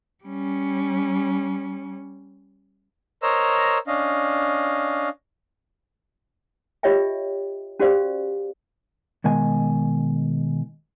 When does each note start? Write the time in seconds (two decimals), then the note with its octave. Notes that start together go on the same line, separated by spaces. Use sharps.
0.24 G3 C#4
3.23 A#4 C5 C#5 D#5 A#5 E6
3.87 C#4 D4 D#5 F5
6.83 F4 G4 C#5 D#5 E5 G5
7.80 C#4 F#4 G4 C5 D5 F5
9.24 B2 D#3 G#3 G#5